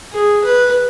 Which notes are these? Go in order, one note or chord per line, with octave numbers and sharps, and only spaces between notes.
G#4
B4